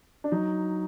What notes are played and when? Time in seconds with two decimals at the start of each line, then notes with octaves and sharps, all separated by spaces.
0.24 D4
0.32 F#3 D#4